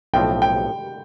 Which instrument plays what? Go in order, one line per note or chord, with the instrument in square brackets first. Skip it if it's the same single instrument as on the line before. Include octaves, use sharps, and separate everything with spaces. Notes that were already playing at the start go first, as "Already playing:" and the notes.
[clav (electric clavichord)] B1 A2 F3 C4 [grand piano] G5
[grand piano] G5